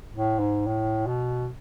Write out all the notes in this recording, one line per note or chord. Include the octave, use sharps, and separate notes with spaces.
A2
G#2
A2
B2